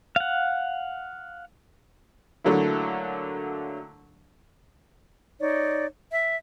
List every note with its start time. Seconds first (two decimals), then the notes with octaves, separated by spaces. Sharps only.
0.16 F5 F#5
2.44 D3 F#3 A3 A#3 E4
5.40 D#4 C#5 D5
6.12 E5